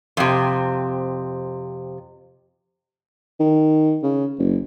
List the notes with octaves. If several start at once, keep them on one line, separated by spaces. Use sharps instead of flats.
F2 C3
D#3
C#3
F#1